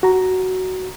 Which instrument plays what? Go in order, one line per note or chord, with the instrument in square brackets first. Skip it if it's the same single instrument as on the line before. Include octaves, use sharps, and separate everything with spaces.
[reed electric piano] F#4 A#5